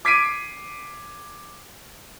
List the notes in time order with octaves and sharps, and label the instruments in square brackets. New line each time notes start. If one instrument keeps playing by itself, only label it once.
[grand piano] D6 G#6 B6 C7 D7 D#7